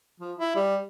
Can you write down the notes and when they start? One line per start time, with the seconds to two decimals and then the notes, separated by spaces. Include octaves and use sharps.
0.20 F3
0.39 E4
0.56 G3